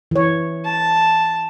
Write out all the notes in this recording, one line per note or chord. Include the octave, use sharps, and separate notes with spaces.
E3 C#5
A5